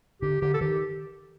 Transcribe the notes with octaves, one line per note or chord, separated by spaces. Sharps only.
D3 G4
D3 G4
A4
D#3 G4